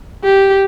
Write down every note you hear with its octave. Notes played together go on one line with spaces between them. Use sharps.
G4